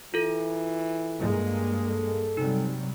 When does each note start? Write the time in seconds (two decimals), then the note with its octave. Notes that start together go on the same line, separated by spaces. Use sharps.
0.14 E3 F4 A4
1.19 G2 G#3 A#3
1.85 A4
2.37 C3 F#3 G3 D#4